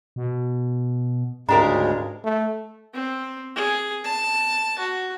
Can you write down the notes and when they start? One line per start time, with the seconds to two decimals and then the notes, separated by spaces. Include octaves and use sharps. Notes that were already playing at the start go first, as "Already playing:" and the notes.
0.16 B2
1.49 D2 G#2 C#3 G#3 D4 G4 A#4 A#5
2.24 A3
2.94 C4
3.55 G#4
4.04 A5
4.79 F#4